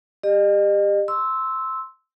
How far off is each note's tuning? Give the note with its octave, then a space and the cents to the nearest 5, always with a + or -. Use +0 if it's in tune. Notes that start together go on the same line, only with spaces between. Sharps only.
G4 +25 D#5 -40
C6 +0 E6 -10